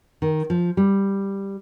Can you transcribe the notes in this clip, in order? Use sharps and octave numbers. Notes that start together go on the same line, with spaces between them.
D#3
F3
G3